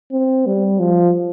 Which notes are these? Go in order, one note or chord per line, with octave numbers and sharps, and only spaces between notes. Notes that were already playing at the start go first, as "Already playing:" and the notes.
C4
G3
F3